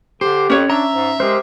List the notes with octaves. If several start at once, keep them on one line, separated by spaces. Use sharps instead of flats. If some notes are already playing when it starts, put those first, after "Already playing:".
D3 G4 C5
F2 F3 C#4 C#5
D4 E5 A#5
G#2
G#3 G4 A#4 C5